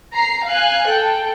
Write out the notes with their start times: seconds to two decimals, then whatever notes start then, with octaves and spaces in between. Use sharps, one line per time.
0.14 A#5 C7
0.46 F5 G#5 F#6
0.88 A4 G5